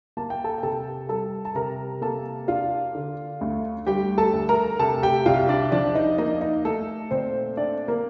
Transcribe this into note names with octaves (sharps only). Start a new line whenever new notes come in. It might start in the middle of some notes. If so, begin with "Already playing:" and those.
A#3 A5
G5
A4 A5
G5
C3 A4 A5
G3 A4 A5
A5
C3 A#4 A#5
A#3 A4 A5
D4 F4 F5
D3
D2
G3 G4 G5
A4 A5
D2
A#4 A#5
C3 A4 A5
G4 G5
C2 F4 F5
D4 D5
F3 D4 D5
D#4 D#5
A#3 D#4 D#5
D#4 D#5
A3 A4
A#2 C4 C5
C4 D4 D5
A#3 A#4